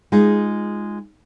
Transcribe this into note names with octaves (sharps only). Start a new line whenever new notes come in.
G#3 D#4 F4 G#4